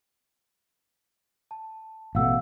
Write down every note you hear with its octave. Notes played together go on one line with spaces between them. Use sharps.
A5
A1 B2 A3 F5 F#5 E6